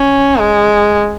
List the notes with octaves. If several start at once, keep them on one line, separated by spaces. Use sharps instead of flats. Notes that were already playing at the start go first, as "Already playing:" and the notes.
Already playing: C#4
G#3